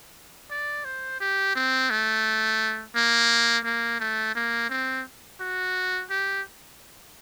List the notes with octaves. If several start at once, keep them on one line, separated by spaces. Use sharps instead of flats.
D5
C5
G4
C4
A3
A#3
A#3
A3
A#3
C4
F#4
G4